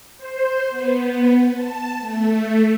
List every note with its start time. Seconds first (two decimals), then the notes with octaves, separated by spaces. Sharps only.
0.18 C5
0.69 B3
1.53 A5
2.00 A3